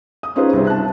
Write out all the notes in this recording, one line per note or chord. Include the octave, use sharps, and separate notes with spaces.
D#6
C#4 D#4 F4 G#4 B4 C5
C2 G2 C4 G#4
A5 F#6